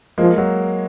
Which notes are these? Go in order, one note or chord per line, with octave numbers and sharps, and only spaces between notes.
F3 G#3 A#3
F#3